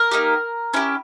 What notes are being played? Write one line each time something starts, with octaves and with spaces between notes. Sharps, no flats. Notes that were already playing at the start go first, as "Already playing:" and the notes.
Already playing: A#4
A#3 D#4 G4
C#4 E4 G4